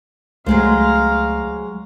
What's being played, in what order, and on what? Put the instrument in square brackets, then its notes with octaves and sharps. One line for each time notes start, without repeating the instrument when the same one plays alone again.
[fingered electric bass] C#2 A3 [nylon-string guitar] F#3 G#3 C5 [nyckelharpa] F5 A#5